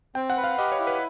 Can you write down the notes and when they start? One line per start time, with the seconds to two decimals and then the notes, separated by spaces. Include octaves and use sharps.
0.15 C4 G5
0.30 F#5
0.37 B4
0.44 F5
0.58 G4 D#5
0.72 C#5
0.79 E4
0.87 B4